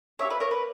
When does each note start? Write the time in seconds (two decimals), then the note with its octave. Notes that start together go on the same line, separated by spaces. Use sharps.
0.19 A#3 D4 C#5 E5
0.25 G4
0.30 B4 D5
0.40 A#4 C#5
0.51 B4